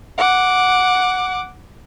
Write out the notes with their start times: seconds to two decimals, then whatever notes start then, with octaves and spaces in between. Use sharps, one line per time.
0.18 F#5 D6